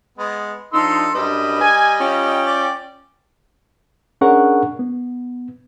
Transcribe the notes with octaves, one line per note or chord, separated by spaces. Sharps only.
G#3 B3
F3 D4 D#4 A4 C6 E6
F#2 G3 D4 B4 D#5
G#5
C#4 F4 G5
D5
C#4 D4 G#4 A#4 F#5 C#6
B3